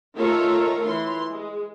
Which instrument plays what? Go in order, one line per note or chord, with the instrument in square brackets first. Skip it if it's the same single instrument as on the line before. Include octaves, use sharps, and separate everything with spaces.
[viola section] D#3 A3 F4 A4 C#5 A#5
E3 C6
G#3